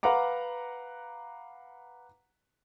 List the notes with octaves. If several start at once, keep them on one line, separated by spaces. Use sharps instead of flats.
B4 F5 F#5 A#5 D6